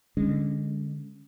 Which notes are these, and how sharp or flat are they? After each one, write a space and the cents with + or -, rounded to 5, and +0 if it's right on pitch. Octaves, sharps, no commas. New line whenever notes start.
D3 +0 G#3 -25 C#4 +0